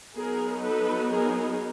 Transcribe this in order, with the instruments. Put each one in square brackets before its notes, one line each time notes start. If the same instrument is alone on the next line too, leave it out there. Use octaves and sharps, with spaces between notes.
[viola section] F#3 B3 D#4 G#4 A#4
A4 B4
G#4 A#4